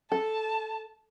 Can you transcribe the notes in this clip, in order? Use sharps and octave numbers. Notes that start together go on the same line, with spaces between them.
A4 A5